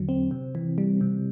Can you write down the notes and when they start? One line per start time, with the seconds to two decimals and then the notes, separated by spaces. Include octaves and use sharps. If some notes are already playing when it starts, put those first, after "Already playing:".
Already playing: E2 D3 F#3
0.09 C4
0.31 C3
0.55 E3
0.78 G3
1.01 C3